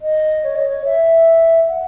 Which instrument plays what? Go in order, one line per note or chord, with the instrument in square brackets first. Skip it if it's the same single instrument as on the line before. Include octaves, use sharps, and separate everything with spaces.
[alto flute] D#5
C#5
D#5
C#5
E5
F#5